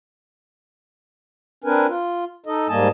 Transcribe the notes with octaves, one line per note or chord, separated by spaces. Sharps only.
C4 D4 A#4 B4 G#5
F4
D#4 A4 D#5
G#2 G3 A#3 D#5 G#5 A5